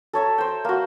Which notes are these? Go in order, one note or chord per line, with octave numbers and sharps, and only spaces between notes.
A4 C#5 E5 A#5
C5 G5
A#3 F#4